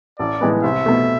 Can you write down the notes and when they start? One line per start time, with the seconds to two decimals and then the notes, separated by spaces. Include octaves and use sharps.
0.19 A1 D5
0.41 A2 E3 G#3 B3
0.63 C2 E5
0.86 B2 A3